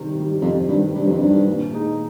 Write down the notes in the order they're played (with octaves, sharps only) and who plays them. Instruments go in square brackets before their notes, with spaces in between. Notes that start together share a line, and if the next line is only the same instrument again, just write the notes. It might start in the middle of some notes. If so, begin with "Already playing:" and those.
Already playing: [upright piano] C3 D#3 G3
D#3
G3
[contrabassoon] F2 [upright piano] C3
[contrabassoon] G2 [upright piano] D#3 G3
[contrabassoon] G2 [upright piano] C3
[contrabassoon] F2
[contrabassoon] G2 [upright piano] D#3 G3
[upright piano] A#2
G#3 D#4